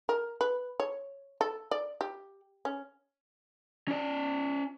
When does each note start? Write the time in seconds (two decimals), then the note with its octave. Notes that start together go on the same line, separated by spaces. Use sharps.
0.09 A#4
0.41 B4
0.80 C#5
1.41 A4
1.71 D5
2.01 G4
2.65 C#4
3.88 C#4 D5